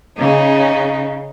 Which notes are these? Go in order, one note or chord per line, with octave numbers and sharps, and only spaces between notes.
C#3 D#4